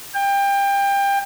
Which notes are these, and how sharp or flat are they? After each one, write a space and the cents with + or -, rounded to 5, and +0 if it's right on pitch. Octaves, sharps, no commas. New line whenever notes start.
G5 +25